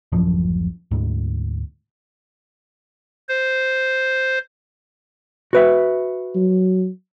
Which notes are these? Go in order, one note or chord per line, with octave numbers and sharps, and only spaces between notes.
D1 A1 F#2 F3
D2 G#2
C5
F#4 B4 E5
F#3